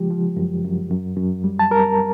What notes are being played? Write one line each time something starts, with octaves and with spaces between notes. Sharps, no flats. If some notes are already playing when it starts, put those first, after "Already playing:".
Already playing: C#3 F3 G#3 G4
F3
F#2
F#2
F#2
F#2
G3
A5
G3 A#4 A#5